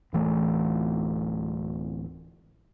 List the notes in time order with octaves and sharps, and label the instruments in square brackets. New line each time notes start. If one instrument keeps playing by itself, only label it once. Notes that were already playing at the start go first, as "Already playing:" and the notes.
[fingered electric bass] D1 E3 A3